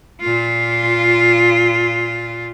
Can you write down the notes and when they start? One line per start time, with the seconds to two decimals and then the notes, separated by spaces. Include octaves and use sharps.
0.21 A#2 F4